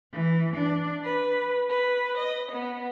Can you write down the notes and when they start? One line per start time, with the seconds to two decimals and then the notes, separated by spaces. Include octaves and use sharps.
0.14 E3
0.57 D4
1.04 B4
1.70 B4
2.17 D#5
2.52 B3